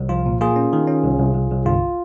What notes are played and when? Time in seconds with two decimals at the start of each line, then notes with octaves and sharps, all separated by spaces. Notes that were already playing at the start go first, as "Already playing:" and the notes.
Already playing: C2
0.09 F3 F4
0.26 A#2
0.41 A#3 F4 G#4
0.56 C#4
0.73 D#3
0.87 C#4
1.04 C2
1.18 C2
1.35 C2
1.50 C2
1.65 G1 F4